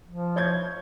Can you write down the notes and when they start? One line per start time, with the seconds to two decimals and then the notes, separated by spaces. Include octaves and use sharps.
0.08 F3
0.36 C#5 G6 G#6